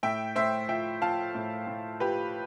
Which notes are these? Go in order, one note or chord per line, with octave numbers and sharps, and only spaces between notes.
A2 E5 G5
A2 C5 E5
F3 E5 G5
F3 F5 A5
A2
A2
F3 G4 B4